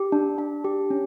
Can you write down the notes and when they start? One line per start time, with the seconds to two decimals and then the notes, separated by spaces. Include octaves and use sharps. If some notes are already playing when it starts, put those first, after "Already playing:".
Already playing: G4
0.12 D4
0.38 D4
0.64 G4
0.90 C#4